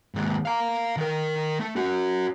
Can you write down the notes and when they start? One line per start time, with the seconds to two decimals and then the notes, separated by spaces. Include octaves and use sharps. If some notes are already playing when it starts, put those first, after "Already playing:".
0.15 D#2 G#2
0.46 F5 A#5
0.97 D#3 A#4
1.60 A3
1.76 C#4 F#4